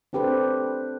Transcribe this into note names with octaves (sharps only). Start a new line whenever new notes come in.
C4 D4 G4 A4 B4 C5